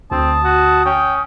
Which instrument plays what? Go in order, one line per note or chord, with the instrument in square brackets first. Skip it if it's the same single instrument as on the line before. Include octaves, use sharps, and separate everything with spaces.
[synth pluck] D2 [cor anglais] C4 [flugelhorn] A5 [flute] D#6
[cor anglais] F#4
[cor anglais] C#4 [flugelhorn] G5